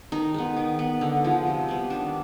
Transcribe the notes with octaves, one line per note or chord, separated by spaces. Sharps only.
D#3 D#4
G#3 B3
D#3
B3
D3
F3 G#3
C3
G3 B3
D#3 D4